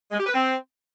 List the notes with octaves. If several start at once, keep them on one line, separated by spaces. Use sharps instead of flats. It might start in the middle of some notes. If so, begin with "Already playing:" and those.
G#3
G4
B4
C4